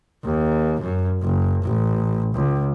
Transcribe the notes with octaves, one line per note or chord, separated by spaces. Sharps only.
D#2
F#2
F#1
A1
C#2